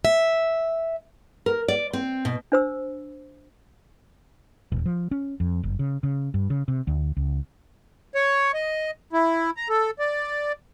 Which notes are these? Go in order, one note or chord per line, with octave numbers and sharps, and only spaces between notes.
E5
A#4
D5
C4
B2
D4 C5 E6
D#1
F3
C#4
F2
F#1
C#3
C#3
G2
C#3
C3
D2
C#2
C#5
D#5
E4
A#5
A4
D5